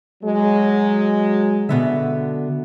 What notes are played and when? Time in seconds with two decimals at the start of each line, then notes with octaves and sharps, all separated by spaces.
0.23 F#3 G#3
1.69 B2 D3 B3 E5